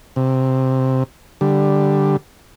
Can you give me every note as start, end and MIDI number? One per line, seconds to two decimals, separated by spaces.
0.16 1.03 48
1.41 2.17 50
1.41 2.17 55